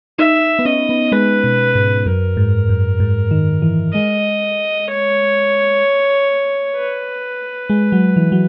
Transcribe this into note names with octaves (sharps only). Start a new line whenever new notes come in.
D#4 E5
B3
C#4 D#5
B3
G#3 B4
B2
G#2
F#2 A#4
G#2
F#2
G#2
D#3
E3
G#3 D#5
C#5
B4
G#3
F#3
E3
F#3